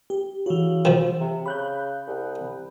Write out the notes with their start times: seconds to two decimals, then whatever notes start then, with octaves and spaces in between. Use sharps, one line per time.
0.10 G4
0.46 C#3 E3 F#4
0.85 D#3 F3
1.20 C3
1.46 C#3 B5 F#6 G6
2.07 C2